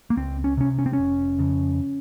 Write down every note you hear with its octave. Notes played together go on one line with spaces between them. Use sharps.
A#3
C#2 C4
C#4
C3 C#4
C#4
C4
F1 C#4
F2 C#3